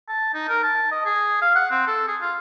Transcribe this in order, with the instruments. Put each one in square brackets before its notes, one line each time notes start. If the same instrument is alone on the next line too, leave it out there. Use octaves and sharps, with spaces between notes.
[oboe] A5
D#4
A#4
A5
D#5
G#4
F5
F#5
C4
A4
G#4
F4